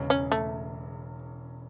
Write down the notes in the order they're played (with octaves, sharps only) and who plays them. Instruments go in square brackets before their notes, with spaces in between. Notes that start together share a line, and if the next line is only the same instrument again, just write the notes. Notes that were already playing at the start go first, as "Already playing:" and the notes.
Already playing: [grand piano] E1 E2 C#3
[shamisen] C#4
A3